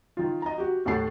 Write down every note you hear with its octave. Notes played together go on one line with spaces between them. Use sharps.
D#3 F4
D#5 A#5
F#4 G4
D#2 A2 A3 F#5 A5 C7